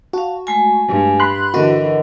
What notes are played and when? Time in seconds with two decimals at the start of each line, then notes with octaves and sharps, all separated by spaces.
0.13 F#4 F5 A5
0.47 G#3 A3 G#5
0.88 G2
1.20 B5 C6 F#6
1.54 D3 E3 F#4 A#4 D#5 F#5